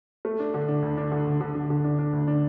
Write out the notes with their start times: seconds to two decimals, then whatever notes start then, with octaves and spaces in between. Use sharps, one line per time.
0.25 A3
0.40 D4
0.54 D3
0.68 D4
0.83 D2
0.97 D4
1.12 D3
1.26 D2
1.41 D3
1.55 D3
1.70 D3
1.84 D4
1.99 D4
2.13 D2
2.27 D4